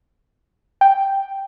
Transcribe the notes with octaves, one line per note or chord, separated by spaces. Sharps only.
G5